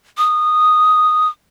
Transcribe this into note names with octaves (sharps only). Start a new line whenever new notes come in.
D#6